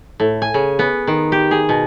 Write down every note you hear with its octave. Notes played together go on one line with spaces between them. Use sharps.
A2
G#5
C#3
B3
D#3
G4
G#4
B2